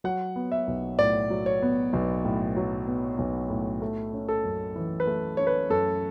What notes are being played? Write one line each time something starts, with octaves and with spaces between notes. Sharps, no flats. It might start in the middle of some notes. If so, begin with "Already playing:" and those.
F#3 F#5
B3
E5
B1
A2 D5
F#3
C#5
B3
B1
A2
F#3
B3
B1
A2
A3
C#4
A4
F#2
E3
B4
A3
C#4 C#5
B4
F#2 A4